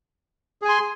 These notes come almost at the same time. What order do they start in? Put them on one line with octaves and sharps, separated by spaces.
G#4 G#5 C6